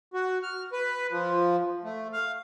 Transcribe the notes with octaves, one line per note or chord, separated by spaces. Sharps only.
F#4
F6
B4
F3
A3
F5